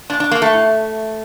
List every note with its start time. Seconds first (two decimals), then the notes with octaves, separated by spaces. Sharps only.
0.10 A#2 D4
0.20 D4
0.31 A#3
0.42 A3
0.53 A2